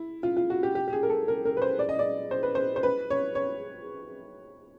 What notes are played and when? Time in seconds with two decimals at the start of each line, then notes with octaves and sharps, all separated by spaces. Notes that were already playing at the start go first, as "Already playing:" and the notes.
Already playing: E4
0.23 F4
0.37 F4
0.50 F#4
0.63 G4
0.75 G4
0.88 G4
0.93 G#4
1.03 A#4
1.10 A4
1.28 A#4
1.45 A#4
1.57 B4
1.62 C5
1.79 D5
1.89 D#5
1.99 D5
2.31 C5
2.43 B4
2.55 C5
2.76 C5
2.83 B4
3.10 C#5
3.35 C#5